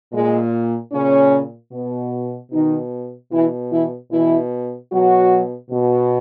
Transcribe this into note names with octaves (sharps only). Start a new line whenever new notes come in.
A#2 G#3
A#2 C#3 C#4
B2
B2 D#3 D#4
B2 E3 E4
E3 E4
B2 E3 E4
B2 F#3 F#4
B2